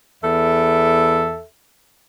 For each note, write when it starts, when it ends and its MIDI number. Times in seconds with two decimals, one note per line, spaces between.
0.22 1.44 40
0.22 1.44 69
0.22 1.44 76